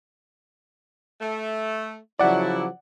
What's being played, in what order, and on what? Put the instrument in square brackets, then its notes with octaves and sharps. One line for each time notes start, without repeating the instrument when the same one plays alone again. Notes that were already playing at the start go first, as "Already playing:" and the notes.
[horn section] A3
[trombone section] C#3 F3 F#3 [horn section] E4 [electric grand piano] D5 F#5